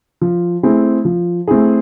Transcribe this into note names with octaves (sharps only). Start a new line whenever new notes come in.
F3
A3 C4 E4 G#4
F3
A3 C4 E4 G#4